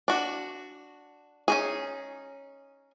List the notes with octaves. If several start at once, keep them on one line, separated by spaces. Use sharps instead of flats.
D4 F#4
C#4 D#4 G#4